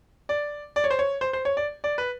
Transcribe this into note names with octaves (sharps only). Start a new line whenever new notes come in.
D5
D5
C#5
C5
C#5
C5
C5
C#5
D5
D5
B4